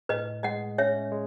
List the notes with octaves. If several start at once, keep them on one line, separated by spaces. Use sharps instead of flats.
A2 B4 D#5
G#3 D#5 F#5
C#4 C#5 E5
G#3